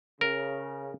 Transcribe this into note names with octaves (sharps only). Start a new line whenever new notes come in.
C#3 A#4